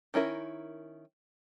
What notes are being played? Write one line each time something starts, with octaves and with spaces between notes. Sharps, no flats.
D#3 C#4 E4 A#4